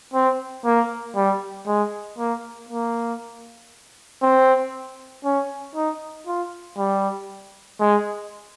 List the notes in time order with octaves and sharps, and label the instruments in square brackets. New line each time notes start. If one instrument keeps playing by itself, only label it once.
[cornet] C4
A#3
G3
G#3
A#3
A#3
C4
C#4
D#4
F4
G3
G#3